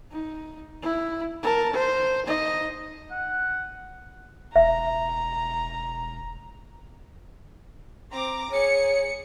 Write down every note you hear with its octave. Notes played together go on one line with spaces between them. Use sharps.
D#4
E4
A#4 A5
C5
D#4 D#5
F#5
E1 E5 A#5
C4 A#5 D6
G#4 C#5 C#7